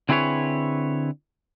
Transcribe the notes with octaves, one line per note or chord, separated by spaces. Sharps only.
D3 C4 E4 G#4 B4 C#5